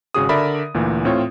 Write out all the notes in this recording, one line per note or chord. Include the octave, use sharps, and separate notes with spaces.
G#1 C#3 F#4 G#4 D#6
D3 A#4 D5 E5 B5
D2 A#2 E3
A2 C4 F4 C#5